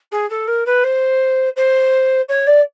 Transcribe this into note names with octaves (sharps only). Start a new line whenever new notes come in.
G#4
A4
A#4
B4
C5
C5
C#5
D5